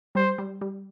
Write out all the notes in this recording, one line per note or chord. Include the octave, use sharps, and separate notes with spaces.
G3 C5
G3
G3